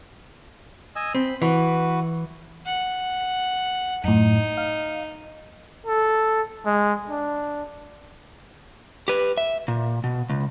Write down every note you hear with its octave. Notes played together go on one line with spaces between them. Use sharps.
D#5 G#5 E6
C4 B5
E3 F#4 B4
F#5
F#2 A2 D#4
F5
A4
G#3
D4
G4 B4
E5
A#2
B2
C#2